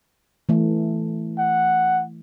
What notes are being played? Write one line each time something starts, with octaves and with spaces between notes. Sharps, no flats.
E3 A3
F#5